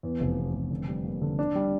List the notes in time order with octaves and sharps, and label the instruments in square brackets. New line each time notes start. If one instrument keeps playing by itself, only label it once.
[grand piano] E2
F1
E2
F1
D3
G3
A#3
D3
D4
G3